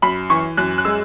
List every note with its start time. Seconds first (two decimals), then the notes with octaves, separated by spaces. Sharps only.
0.02 F#2 B5
0.30 E3 C#6
0.57 F#2 F#6
0.78 F#6
0.85 G#3 E6